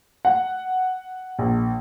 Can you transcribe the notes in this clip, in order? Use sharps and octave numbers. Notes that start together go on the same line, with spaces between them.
F#5
A#1